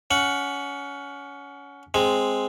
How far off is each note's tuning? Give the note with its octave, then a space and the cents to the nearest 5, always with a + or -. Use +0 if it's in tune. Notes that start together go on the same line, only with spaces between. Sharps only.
C#4 +25 F#5 +0
G#3 +0 C4 +0